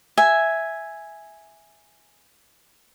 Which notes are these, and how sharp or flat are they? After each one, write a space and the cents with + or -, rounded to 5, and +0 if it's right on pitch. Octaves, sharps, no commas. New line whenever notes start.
E5 +0 G#5 +0